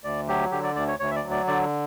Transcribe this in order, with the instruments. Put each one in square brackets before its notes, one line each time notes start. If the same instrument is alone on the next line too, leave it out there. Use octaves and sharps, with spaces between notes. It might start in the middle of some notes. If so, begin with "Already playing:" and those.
[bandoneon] D2 D5
F#3 G4
D3 G4
D5
D2 D5
C#5
D2 C#5
E5
D5
F#3
D5
D3 D5